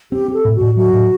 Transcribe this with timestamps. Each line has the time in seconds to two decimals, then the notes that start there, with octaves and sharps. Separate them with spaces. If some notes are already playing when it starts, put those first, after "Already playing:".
0.12 C4 G4
0.28 C4
0.33 A4
0.45 A2
0.55 F#4
0.61 A2
0.77 F#3 F#4
0.93 A2